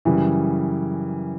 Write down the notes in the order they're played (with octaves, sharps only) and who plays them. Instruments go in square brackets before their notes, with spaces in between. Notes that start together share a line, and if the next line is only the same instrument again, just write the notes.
[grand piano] F#2 C#3 E3 G3